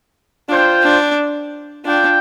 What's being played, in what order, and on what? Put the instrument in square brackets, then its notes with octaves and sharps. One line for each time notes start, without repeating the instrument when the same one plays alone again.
[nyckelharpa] D4 [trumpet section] F4 C5 G5
[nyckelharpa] D4
[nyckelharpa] D4 [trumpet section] F4 D5 G5